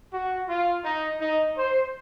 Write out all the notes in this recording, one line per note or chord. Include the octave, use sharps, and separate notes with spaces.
F#4
F4
D#4
D#4
C5